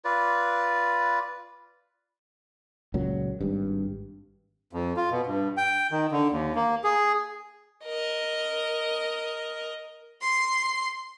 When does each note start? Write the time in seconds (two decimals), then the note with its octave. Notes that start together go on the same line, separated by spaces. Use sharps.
0.05 F4 B4 D5
2.94 C#2 A#2 F#3
3.40 G#1 G2
4.73 F2
4.97 F4
5.11 B2
5.26 G2
5.57 G5
5.91 D#3
6.12 D3
6.32 D#2
6.55 A#3
6.84 G#4
7.84 A#4 D#5
10.21 C6 C7